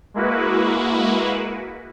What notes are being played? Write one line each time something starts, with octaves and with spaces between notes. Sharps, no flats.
G#3 A#3 E4 F#4 B4